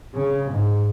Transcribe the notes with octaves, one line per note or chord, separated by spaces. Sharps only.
C#3
G#2